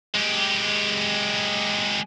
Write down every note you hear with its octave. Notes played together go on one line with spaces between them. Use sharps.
G#3 G4